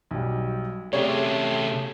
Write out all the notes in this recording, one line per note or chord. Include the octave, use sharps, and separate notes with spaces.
B1 G3
C3 A3 C#4 G4 G#4 C#5